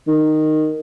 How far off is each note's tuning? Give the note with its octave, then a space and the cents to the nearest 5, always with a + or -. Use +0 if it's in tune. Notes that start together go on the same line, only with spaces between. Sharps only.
D#3 -10